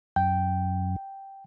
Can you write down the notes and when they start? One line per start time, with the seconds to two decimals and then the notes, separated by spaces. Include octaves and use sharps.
0.16 F#2 G5